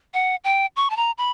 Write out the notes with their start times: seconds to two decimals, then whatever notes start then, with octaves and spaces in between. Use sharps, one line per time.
0.14 F#5
0.44 G5
0.76 C#6
0.90 A5
0.97 A#5
1.18 B5